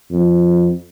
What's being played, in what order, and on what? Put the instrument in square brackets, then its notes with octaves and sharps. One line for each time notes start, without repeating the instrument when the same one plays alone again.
[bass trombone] F2